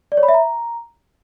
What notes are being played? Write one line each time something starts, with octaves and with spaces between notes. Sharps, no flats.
D5
C#5
B5
E5
A#5